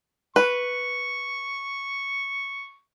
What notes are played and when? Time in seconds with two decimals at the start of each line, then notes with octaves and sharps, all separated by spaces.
0.36 B4 C#6